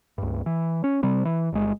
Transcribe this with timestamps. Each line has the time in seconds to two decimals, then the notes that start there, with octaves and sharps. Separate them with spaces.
0.18 C#2 G2
0.46 E3
0.84 C#4
1.03 C3 G3 C4
1.25 E3
1.53 G1 G#3